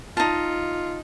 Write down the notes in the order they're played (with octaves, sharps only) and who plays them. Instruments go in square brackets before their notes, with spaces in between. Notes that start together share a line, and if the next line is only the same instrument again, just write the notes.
[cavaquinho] D#4 A5 [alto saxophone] F4